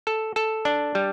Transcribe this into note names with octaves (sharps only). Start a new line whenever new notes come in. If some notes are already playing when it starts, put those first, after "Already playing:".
A4
A4
D4
G3